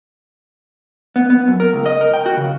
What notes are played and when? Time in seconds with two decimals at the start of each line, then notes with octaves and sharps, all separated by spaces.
1.16 B3
1.30 B3
1.48 F#2
1.60 A#4
1.73 C#2
1.86 D#5
2.01 A#4
2.14 G5
2.26 F#4
2.37 C#3